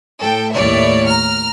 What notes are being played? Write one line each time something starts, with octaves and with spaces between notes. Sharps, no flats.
A2 A4 G5
D#2 A2 C#5 D5 E5
A#5 F6